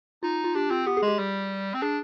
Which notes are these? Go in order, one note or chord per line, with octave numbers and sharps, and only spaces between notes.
D#4 F4
F4
D4 G4
C4 F4
B3 G4
G#4
G#3
G4
G3
C4
D4 G#4